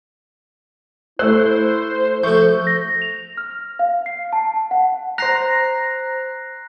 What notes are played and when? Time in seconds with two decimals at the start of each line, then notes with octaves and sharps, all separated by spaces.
1.19 A3 E4 C5 E6 F#6
2.23 F3 A3 F#4 C#6 G6
2.67 A#6
3.02 F7
3.37 F6
3.79 F5
4.06 C7
4.33 A5
4.71 F#5
5.18 C5 A#5 F#6 A#6 C7